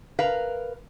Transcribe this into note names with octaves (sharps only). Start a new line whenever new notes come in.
A#4 B4 F5